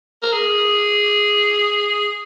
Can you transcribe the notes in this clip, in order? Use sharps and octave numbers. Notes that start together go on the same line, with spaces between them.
A#4
G#4